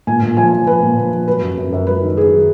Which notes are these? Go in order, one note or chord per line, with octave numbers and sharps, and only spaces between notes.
A#2 G#5
A#2
F3 G#5
F3
F3 B4
A#2
F3
F3
F#3 B4
F#2
F#2
F#2
F#3 B4
D#3
F#3 G#4
D#3